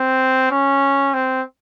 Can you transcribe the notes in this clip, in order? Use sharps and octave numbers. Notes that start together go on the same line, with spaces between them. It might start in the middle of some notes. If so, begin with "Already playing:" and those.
Already playing: C4
C#4
C4